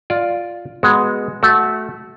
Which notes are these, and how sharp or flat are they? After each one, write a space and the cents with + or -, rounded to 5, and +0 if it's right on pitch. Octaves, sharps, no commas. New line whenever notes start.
F4 +0 D5 +0
G#3 +0 B3 -10 F#4 +0
A3 -15 F#4 +0